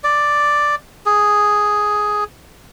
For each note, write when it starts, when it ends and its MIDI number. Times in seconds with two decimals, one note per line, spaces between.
0.04 0.75 74
1.06 2.24 68